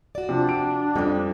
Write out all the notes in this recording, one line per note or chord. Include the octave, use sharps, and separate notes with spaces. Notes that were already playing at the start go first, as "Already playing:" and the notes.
F#4 D5
C3 F3 D4
D7
F2 G3 C#4